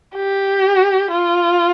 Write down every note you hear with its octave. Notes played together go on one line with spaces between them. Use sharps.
G4
F4